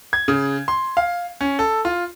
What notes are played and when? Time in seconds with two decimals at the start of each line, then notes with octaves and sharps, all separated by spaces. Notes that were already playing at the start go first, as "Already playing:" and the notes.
0.13 G#6
0.28 C#3
0.68 C6
0.97 F5
1.41 C#4
1.59 A4
1.85 F4